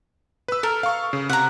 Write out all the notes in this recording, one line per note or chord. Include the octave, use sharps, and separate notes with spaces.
B4 E6
A4 A#4
F5 C#6
C#3
C3 F#5 A#5